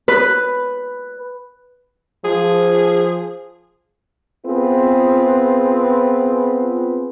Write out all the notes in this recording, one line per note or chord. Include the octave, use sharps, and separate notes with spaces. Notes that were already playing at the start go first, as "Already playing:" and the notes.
B4
F3 G#4
B3 C4 F4 G#4 B4